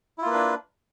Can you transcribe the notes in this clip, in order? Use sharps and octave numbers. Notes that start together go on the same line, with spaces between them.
A#3 D4 E4 F4 B4